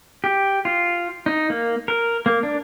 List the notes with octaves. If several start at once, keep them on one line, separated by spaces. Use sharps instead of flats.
G4
F4
D#4
A#3
A#4
A#3
D4